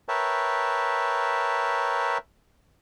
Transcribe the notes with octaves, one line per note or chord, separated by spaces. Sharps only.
A#4 B4 C#5 E5 G5 A5